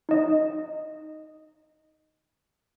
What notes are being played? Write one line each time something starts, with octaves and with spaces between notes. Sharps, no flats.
D#4 D#5